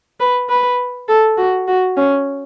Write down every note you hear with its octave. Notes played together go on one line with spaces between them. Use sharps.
B4
B4
A4
F#4
F#4
C#4